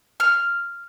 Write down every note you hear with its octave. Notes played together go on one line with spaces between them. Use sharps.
F6